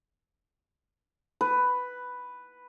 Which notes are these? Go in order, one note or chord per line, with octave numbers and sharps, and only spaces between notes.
B4